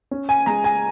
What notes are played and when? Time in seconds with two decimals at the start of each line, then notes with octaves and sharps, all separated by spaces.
0.11 C#4
0.29 G#5
0.46 G#3 A#5
0.64 G#5